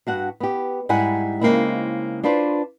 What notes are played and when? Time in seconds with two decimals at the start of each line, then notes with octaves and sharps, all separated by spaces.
0.07 G2 F#4 F#5
0.40 B3 G4
0.89 G#2 G3 E4 F#5 G#5
1.41 C#3 G#3 A#3 C4 D#4 E4
2.23 D4 F4 B4 C5 D5